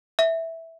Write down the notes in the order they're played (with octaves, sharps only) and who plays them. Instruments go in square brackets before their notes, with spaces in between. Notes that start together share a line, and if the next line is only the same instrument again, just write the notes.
[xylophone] E5